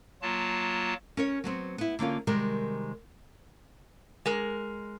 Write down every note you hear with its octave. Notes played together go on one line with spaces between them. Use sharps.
F#3 A#3 F4 A5
C#4 A#4 C#5
F#3 B3 C4
B3 E4
D3 A#3 C#4 F4
C3 D#3 G3 G#3 A#4
G#3 A#4